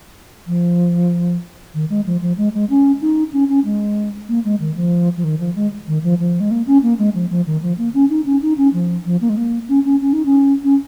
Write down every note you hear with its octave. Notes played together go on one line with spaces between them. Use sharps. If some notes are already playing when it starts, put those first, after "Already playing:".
F3
D#3
G#3
F3
F3
G#3
G#3
C#4
D#4
C#4
C#4
G#3
A#3
G#3
D#3
F3
F3
D#3
F3
G#3
D#3
F3
F3
G#3
A#3
C#4
A#3
G#3
F3
F3
D#3
F3
A#3
C#4
D#4
C#4
D#4
C#4
F3
F3
A#3
G#3
A#3
C#4
C#4
C#4
D#4
C#4
C#4